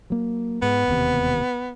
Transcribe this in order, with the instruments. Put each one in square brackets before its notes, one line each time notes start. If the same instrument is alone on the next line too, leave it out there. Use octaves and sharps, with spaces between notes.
[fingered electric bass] F#3 A#3
[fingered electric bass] G#2 G#3 [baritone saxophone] B3
[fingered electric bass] E1 D#2 C3